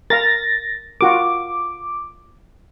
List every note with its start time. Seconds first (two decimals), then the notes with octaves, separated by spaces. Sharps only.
0.10 A#4 F5 A6 A#6
1.01 F4 F#4 A#4 D6